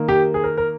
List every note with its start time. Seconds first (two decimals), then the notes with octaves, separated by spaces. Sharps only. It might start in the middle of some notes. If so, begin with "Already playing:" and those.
Already playing: D#3 A#3
0.08 G4
0.34 G#4
0.44 A#4
0.57 A#4